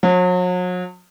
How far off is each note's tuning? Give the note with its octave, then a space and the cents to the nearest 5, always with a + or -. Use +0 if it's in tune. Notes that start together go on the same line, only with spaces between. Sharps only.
F#3 -40